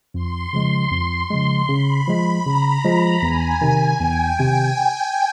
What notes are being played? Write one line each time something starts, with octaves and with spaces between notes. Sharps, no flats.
F2 C6
C#3 F3 G#3
F2
C#3 F3 G#3
C#3 B5
F3 G#3
C#3 A#5
F3 G#3
E2 G#5
C3 D#3
E2 G5
C3 D#3 G5